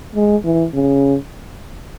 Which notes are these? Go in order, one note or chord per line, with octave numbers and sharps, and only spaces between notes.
G#3
E3
C#3